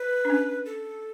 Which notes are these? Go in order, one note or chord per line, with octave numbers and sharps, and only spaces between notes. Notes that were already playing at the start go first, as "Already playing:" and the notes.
Already playing: B4
D4
C#4
A4